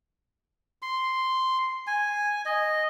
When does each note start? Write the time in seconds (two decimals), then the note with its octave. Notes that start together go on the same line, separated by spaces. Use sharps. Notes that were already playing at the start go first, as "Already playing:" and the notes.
0.82 C6
1.87 G#5
2.46 D#5